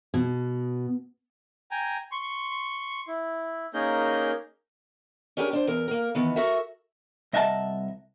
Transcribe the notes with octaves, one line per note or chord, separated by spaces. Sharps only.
B2
G5 G#5 A#5
C6 C#6
E4
A#3 C#4 D#4 G#4 A#4 G6
C#4 D4 G4 G#4 A#4
D4 C5
E2 A#4
A#3 A#4
D#3 E3 B3
F#4 A4 A#4 E5
C2 D#5 E5 F#5 G#5 A5